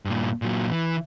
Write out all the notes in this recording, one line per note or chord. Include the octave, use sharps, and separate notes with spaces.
G2 A#2
A#2 F#3
E3